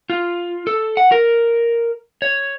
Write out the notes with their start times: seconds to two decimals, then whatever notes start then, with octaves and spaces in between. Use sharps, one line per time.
0.10 F4
0.67 A4
0.97 F#5
1.12 A#4
2.22 C#5